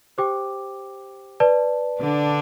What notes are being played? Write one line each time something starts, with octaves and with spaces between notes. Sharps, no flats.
G4 C5 G5 D6
B4 D5 A5
D3 D4